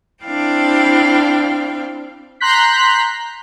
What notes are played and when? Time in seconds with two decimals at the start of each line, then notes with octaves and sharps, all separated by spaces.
0.24 C4 D4 E4 F5 G5
2.40 A#5 C6 F#6 G6 B6